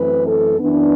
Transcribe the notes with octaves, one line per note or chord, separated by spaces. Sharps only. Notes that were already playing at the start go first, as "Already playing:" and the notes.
Already playing: F#2 E3 A3 C4 B4
A4
F#2 E3 B3 D4